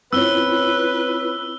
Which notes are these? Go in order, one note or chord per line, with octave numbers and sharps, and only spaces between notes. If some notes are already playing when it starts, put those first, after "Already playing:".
C4 C#4 E4 F4 B4 C#5 E6 G7